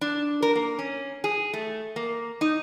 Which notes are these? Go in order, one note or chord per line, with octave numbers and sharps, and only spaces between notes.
D4
A#4
A#3
C#4
G#4
A3
A#3
D#4